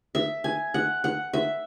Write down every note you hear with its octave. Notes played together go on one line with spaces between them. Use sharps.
E5
G#5
F#5
F#5
E5